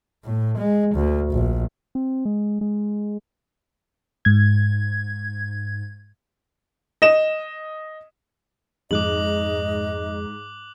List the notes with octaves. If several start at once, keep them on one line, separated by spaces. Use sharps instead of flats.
A2
G#3
D2
A#1
C4
G#3
G#3
G#2 G#6
D#5 E7
F2 G#2 D#5 D6 F#6 F#7